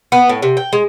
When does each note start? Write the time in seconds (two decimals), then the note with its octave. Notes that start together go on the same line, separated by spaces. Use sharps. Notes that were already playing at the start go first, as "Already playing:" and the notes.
0.12 B3
0.29 A2
0.42 C3
0.57 G5
0.73 G#3